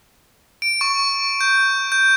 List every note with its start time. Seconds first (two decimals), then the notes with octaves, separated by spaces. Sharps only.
0.62 D7
0.81 C#6
1.41 G6
1.92 G6